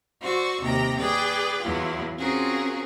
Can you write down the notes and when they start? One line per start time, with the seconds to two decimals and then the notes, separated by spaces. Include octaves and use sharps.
0.22 F#4 C5 D5 C#6 E6
0.62 D#2 C3 G5 A#5
0.98 G#4 B4 D5 G5
1.62 E2 F#3 E4 F4
2.18 C4 C#4 F4 F#4 G#4 A#4